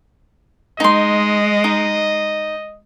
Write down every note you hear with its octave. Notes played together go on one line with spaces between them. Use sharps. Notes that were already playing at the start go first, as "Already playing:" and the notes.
G#3 D#4 D#5 C6
D#4